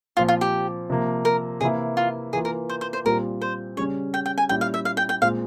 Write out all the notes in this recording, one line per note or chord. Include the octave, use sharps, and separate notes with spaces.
A#2 F3 C4 F4
F4
G4
C3 F3 A#3
A#4
C3 E3 A#3 E4 G#4
F4
E3 A#3 F4 G#4
A#4
C5
C5
C5
A#2 G3 C4 F4 A#4
C5
C#3 G3 C#4 C#5
G5
G5
G#5
A#2 G3 C#4 E4 G5
F5
E5
F5
G5
G5
A#2 G#3 C4 F4 F5